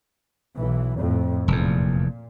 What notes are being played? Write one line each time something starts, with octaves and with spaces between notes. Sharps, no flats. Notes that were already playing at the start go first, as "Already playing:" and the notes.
B1 E3
F2 A2
F1 E2 A#2